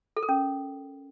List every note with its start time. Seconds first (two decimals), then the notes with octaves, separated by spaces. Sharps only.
0.17 A4
0.23 A#4
0.29 C#4